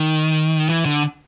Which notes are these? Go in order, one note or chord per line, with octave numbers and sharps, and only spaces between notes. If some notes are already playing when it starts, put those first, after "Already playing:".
Already playing: D#3
E3
D3